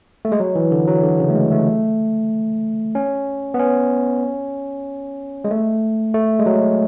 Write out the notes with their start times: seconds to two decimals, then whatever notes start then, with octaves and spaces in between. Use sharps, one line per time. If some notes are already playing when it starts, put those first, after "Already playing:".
0.25 A3
0.32 G#3
0.40 F#3
0.55 E3
0.72 D3
0.87 F#3
1.03 D3
1.19 C#3
1.30 A3
1.35 G#3
1.52 A3
2.95 C#4
3.54 B3
3.59 C#4
5.44 G#3
5.51 A3
6.14 A3
6.39 G#3
6.46 F#3